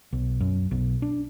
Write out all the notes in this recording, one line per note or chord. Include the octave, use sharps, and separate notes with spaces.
B1
F#2
B1
D4